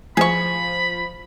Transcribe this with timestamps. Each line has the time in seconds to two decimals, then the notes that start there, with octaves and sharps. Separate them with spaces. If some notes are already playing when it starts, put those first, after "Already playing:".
0.17 F3 G#4 B5 C#6